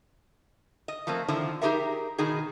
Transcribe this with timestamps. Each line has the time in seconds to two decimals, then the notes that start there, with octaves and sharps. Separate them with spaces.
0.88 D#5
1.07 F3 A3 A#3 C4
1.28 D3 D#3 F3 D4 E4
1.62 D#4 G4 G#4 A#4 E5
2.18 B2 D#3 D#4 G#4